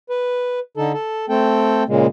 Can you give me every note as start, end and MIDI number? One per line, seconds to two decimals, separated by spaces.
0.10 0.59 71
0.77 0.92 50
0.77 0.92 63
0.77 0.92 69
0.93 1.26 69
1.29 1.83 57
1.29 1.83 60
1.29 1.83 69
1.29 1.83 79
1.88 2.07 46
1.88 2.07 49
1.88 2.07 56
1.88 2.07 58